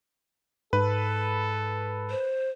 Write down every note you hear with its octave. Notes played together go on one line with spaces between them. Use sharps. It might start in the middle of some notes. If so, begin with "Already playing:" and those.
G#2 A4 B4
C5